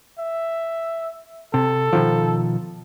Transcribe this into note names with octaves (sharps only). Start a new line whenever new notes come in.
E5
C3 A4
B2 D#3 F3